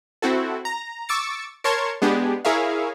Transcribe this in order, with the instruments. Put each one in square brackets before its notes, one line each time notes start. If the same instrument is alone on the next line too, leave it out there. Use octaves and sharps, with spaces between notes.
[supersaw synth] C4 E4 F#4 A4
A#5
C#6 D6 E6 A6 C#7
A#4 C#5 A5 C6 C#6 G#6
G#3 B3 D4 G4 G#4
E4 G#4 A#4 C#5 E5 F5